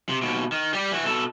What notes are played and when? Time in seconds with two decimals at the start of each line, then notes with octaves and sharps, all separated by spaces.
0.09 C3
0.22 D#2 B2
0.52 D#3
0.73 G3 G4
0.92 E3 F#4
1.05 B2 A4